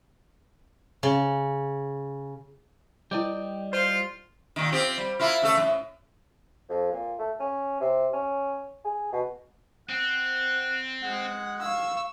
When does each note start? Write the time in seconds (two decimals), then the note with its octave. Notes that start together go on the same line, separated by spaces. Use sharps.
1.03 C#3
3.11 G3 E4 B4 D5 D#5 G5 D6
3.73 F4 C5
4.56 A#2 D#3
4.72 C4 F4 G4
4.98 G3
5.19 A#3 E4 F4
5.42 C#3 A3 A4
5.57 F#2 A2
6.70 F2
6.92 A#2
7.19 A3
7.40 C#4
7.81 C3
8.14 C#4
8.85 G#4
9.13 B2
9.89 C4 F#5
11.04 G#3 F#5
11.62 F5 C#6 E6